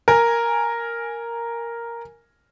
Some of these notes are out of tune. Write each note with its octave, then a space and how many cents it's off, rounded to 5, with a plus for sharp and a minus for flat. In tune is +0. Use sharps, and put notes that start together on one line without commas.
A#4 +0 G#5 +0